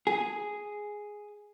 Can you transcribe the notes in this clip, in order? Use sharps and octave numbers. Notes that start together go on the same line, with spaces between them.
G#4